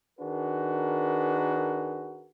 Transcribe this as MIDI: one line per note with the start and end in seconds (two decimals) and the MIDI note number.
0.20 2.28 51
0.20 2.28 62
0.20 2.28 66
0.20 2.28 68
0.20 2.28 70
0.20 2.28 71